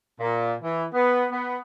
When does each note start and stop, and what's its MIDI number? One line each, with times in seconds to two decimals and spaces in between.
0.19 0.52 46
0.62 0.82 52
0.93 1.26 59
1.31 1.57 59